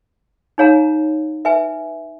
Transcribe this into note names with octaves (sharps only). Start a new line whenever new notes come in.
D#4 G#4 C#5 F5 A#5
B4 E5 G#5